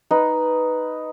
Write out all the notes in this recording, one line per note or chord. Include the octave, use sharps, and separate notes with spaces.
D#4 B4